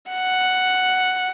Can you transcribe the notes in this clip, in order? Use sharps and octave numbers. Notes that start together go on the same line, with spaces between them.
F#5